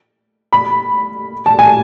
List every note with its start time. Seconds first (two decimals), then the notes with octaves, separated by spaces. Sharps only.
0.52 B5
1.46 A5
1.59 G#5